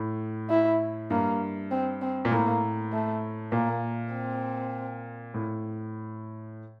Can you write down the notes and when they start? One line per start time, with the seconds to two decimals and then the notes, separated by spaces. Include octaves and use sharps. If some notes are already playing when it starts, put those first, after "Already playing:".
Already playing: A2
0.50 E4
1.10 G2 A#3
1.71 C4
2.02 C4
2.25 A#2
2.31 A2 A#3
2.92 A3
3.52 A#2 A#3
4.13 C4
5.34 A2